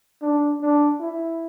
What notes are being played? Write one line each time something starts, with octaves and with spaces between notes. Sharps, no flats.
D4
D4
E4